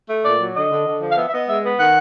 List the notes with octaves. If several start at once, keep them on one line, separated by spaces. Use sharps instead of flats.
A3
A#2 D5
F#3
D3 D#5
D3
D3
F3
F5
B3 E5
E5
B3 D#5
G#3 E5
B3
D#3 F#5